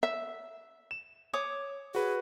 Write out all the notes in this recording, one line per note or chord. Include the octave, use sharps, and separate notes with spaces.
E5
E7
C#5 D6 D#6
F#4 G#4 B4